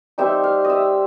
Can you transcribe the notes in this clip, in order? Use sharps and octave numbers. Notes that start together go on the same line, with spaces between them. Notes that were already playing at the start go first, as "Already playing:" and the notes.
G3 C4 D#4 E5
F5
D#5
E5